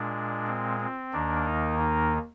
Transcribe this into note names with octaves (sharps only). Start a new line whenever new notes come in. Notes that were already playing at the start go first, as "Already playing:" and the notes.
Already playing: A#2 G#3 D4
C4
C4
D#2 D#3 A#3 D4
D#4
D#4